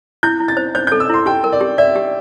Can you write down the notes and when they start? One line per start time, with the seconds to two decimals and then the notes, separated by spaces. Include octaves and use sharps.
0.23 E4 G6
0.40 E4
0.48 A6
0.57 C5
0.75 C5 G6
0.87 A4 G6
1.00 E6
1.10 E4 C6
1.26 G4 G5
1.44 A#4
1.52 D5
1.61 G4
1.78 D5 E5
1.95 G4